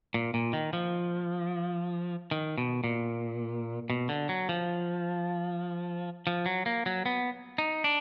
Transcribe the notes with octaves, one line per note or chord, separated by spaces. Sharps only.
A#2
A#2
D#3
F3
D#3
B2
A#2
B2
D3
F#3
F3
F3
F#3
A#3
F#3
B3
D#4
D4